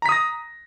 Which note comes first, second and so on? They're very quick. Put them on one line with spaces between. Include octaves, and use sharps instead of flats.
A#5 B6 D#6 A#6